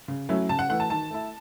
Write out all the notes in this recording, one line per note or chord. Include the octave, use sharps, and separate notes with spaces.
C#3
F#3 A3 C#4 E4
C#3 A5
F#5
E3 A3 F#5
A5
D#3 A5
A3 E4